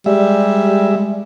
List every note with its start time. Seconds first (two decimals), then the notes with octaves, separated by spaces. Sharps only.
0.06 G3 G#3 E5